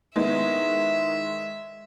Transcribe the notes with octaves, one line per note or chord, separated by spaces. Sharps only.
D#3 G#3 B3 E4 E5